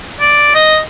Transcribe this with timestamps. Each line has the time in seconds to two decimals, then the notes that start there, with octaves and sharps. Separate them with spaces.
0.20 D5
0.54 D#5